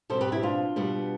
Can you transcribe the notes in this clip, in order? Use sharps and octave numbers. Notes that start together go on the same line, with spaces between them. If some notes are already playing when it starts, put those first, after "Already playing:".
B2 G3 C4 A4 C5
G4 B4
E4 G4
D4 F4
B2 G3 B3